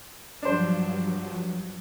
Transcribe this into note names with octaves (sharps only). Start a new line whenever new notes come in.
G2 F3 F#3 D4 C5